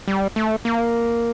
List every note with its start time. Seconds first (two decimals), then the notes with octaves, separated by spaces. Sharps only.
0.08 G3
0.36 A3
0.65 A#3